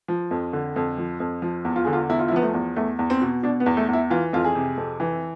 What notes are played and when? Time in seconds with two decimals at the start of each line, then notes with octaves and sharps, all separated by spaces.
0.08 F3
0.31 F2
0.53 D3
0.76 F2
0.98 F3
1.20 F2
1.42 F3
1.65 E2
1.76 F4
1.84 D3 G#4
1.93 F4
2.09 E2 E4
2.19 F4
2.28 E4
2.32 F3 B3
2.43 A3
2.54 E2
2.76 E2 A3
2.99 E2
3.10 C4
3.22 B2
3.43 B2 D4
3.60 B3
3.66 E2
3.77 A3
3.88 E2 E4
4.10 E3 F4
4.33 F2 F4
4.45 G#4
4.55 C3
4.77 F2
5.00 E3